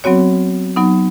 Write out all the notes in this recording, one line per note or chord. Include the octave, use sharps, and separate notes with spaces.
F#3 B3 C4 F#4 C#5
F#3 B3 D#4